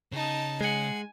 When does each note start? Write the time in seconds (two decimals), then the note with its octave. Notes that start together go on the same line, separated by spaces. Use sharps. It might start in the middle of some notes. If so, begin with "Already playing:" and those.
0.12 C#3 D#4 A5
0.61 G#3 G#4 F#5 G#5